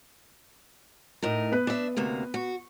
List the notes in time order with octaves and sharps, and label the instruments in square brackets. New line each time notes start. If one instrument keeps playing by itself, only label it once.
[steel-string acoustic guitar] A2 D#4 A#4
[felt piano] B3 B4
[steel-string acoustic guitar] D4 E5
D2 C3 A#3
F#4